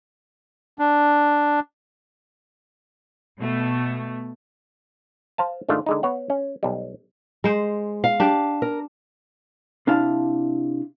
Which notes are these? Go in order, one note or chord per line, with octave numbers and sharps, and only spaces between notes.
D4
B2 A3
C5 F5 A5
G#2 D#3 A3 D4 F4
D3 G#3 D#4
B3 C#5 F#5
C#4
B1 G3
G#3 C5
F5
D4 G4
A#4
C3 D4 E4 F5 A5